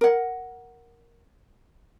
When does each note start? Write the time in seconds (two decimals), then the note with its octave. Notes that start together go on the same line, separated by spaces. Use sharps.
0.01 A#4 F#5